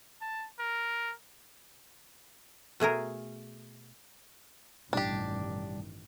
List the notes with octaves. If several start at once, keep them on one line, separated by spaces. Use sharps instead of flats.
A5
A#4
B2 A3 G#4 A#4
A1 G2 B2 D#3 G3 D4 G4